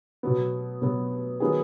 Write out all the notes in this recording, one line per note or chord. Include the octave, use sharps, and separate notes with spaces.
B2 F#3 B3
B2 F#3 B3
D#3 F#3 B3 D#4 G#4